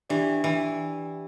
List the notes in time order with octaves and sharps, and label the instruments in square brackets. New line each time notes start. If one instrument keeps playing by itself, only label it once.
[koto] E3 [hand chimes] D4 G4 D5
[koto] E3